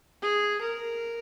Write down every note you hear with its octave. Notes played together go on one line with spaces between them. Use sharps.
G#4
A#4